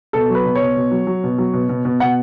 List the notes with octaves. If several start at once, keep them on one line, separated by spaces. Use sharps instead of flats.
B2 A4
F#3
B4
B2
C#5
B2
B2
F#3
F#3
B2
F#3
B2
B2
B2
B2 F#5